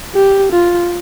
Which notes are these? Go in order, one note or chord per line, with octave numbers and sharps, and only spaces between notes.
G4
F4